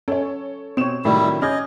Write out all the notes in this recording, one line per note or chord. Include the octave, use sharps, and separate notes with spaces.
C#4 A4 C#5
B2 C4 C#5 E7
A2 C3 D#3 F#3 G3 A3 D4 E4
C#4 G#4 D#5 D6 F6 G6 G#6